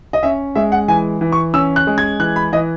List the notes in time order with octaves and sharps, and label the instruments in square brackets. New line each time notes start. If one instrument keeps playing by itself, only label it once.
[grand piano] D#5
C#4 E5
G#3 E5
F#5
E3 G#5
E3
C#6
C#4 E6
F#6
G#3
G#6
E3 F#6
B5
E3 D#5